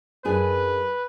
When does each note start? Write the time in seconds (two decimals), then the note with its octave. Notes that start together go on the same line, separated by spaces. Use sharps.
0.25 F#2 D4 G#4 B4